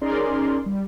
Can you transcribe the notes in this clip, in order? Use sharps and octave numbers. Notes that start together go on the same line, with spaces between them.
C#4 D#4 G#4 A#4 D5 C6
G3